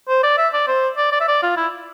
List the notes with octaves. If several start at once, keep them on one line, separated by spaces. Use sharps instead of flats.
C5
D5
E5
D5
C5
D5
D5
E5
D5
F4
E4